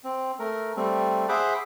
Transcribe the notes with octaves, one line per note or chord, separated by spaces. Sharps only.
C4
A3 A#4
G3 A3 C4
G#4 C5 E5 F#5 B5 D6